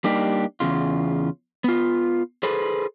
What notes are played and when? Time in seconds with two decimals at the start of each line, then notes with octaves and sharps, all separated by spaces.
0.04 G3 A#3 D4 D#4 G4
0.60 E2 C#3 F4
1.64 B3 F4
2.43 G#4 A4 B4 C5